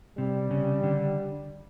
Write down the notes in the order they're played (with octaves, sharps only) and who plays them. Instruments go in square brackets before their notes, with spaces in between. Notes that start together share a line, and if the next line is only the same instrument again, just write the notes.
[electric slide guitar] C3 [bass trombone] G3
[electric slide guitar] C#3
D3